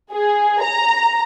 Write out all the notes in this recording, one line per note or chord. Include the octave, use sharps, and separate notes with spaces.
G#4
A#5